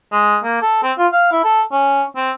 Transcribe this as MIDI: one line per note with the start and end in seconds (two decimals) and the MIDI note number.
0.12 0.37 56
0.44 0.61 58
0.62 0.80 69
0.83 0.92 60
0.98 1.07 65
1.13 1.30 77
1.32 1.43 64
1.44 1.62 69
1.72 2.03 61
2.16 2.31 60